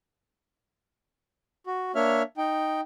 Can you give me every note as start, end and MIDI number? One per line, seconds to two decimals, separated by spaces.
1.67 1.92 66
1.95 2.22 58
1.95 2.22 62
1.95 2.22 73
1.95 2.22 76
1.95 2.22 89
2.38 2.81 63
2.38 2.81 79